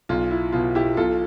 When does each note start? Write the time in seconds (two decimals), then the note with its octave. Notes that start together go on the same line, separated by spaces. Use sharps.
0.09 B1 F4
0.31 E4
0.53 B2 F4
0.75 E4 G4
0.97 B1 F4 A4